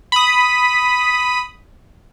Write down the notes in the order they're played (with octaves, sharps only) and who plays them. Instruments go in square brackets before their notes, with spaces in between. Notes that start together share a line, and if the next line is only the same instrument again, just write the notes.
[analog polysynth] B5 D#6